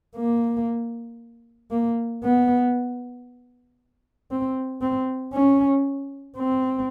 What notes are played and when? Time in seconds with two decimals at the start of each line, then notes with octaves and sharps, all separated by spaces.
0.16 A#3
1.71 A#3
2.23 B3
4.31 C4
4.82 C4
5.34 C#4
6.37 C4